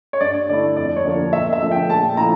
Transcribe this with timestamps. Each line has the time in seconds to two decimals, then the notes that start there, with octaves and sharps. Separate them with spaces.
0.13 C#5
0.20 G2 D5
0.49 D3 A3 E4 D5
0.76 F2 D5
0.96 C#5
1.05 D3 F3 A#3 D4 D5
1.33 E1 E5
1.53 E5
1.62 D2 D3 F3 A3
1.72 G5
1.90 A#1 A5
2.17 F3 A3 E4 A#5